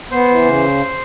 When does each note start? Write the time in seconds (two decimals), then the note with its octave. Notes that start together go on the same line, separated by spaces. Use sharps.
0.11 B3 C5
0.29 E3
0.45 C#3